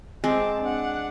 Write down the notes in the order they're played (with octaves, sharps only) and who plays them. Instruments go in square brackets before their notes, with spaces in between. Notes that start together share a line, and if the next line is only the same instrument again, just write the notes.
[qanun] G#3 [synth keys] C4 [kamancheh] A5 D6
[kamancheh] D4 F#5